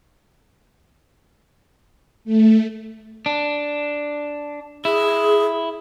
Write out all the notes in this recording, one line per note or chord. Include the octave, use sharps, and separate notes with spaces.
A3
D4
E4 G#4